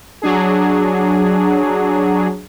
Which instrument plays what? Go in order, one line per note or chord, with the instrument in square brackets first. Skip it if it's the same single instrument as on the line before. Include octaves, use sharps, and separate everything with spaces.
[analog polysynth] F#3 D4 G#4